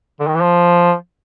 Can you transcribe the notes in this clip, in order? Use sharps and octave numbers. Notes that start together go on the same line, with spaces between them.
D3
D#3
E3
F3